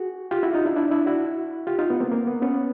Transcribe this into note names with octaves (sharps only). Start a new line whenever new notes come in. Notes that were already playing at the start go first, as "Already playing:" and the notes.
Already playing: F#4 G#4
F4 G4
E4 F#4
D#4 F4
D4 E4
D4 E4
D4 E4
E4 F#4
F4 G4
D#4 F4
B3
A#3 C4
A#3
B3
B3 C#4